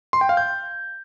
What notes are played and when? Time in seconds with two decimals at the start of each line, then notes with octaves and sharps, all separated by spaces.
0.13 C6
0.21 G5
0.29 F5
0.37 G6